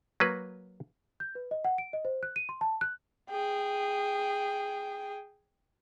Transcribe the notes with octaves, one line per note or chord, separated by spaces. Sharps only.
F#3 A#3 B4
G6
B4
D#5
F#5
D7
D#5
C5
F#6
D#7
C6
A5
F#6
G#4 G5